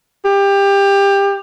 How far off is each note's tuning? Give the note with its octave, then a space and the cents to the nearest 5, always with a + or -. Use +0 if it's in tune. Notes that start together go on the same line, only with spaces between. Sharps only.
G4 +20